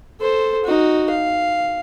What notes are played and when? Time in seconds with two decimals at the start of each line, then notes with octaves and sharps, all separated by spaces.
0.20 A4 C5
0.65 D#4 F#4
1.10 F5